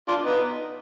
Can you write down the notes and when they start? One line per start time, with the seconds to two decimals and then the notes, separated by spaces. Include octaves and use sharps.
0.08 D4 F4
0.24 B3 D#4